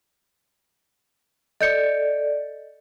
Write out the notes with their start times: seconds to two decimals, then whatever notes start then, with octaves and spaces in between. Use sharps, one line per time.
1.61 A4 D5 D#5 G6 C#7